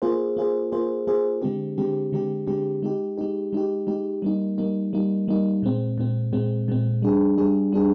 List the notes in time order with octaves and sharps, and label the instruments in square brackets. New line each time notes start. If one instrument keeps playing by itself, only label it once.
[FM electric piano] A#3 F4 G#4 C5
A#3 F4 G#4 C5
A#3 F4 G#4 C5
A#3 F4 G#4 C5
D3 G#3 C4 G4
D3 G#3 C4 G4
D3 G#3 C4 G4
D3 G#3 C4 G4
G#3 D#4 G4
G#3 D#4 G4
G#3 D#4 G4
G#3 D#4 G4
G3 A#3 D#4
G3 A#3 D#4
G3 A#3 D#4
G3 A#3 D#4
A#2 G#3 C4
A#2 G#3 C4
A#2 G#3 C4
A#2 G#3 C4
G3 D4 G#4
G3 D4 G#4
G3 D4 G#4